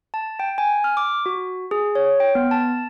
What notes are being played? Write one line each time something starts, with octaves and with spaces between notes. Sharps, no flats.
A5
G5
G#5
F6
D6
F#4
G#4
C#5
G5
B3
A5